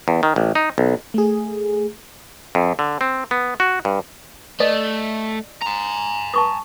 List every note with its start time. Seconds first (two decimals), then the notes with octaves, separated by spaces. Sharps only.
0.08 E2
0.23 D#3
0.36 A1
0.55 D#4
0.78 B1
1.14 A3 G#4
2.55 F2
2.79 D3
3.01 C4
3.31 B3
3.60 F#4
3.85 G2
4.60 A3 D5 D#5 D#6
5.62 G#5 A#5
6.34 A5 C#6 D#6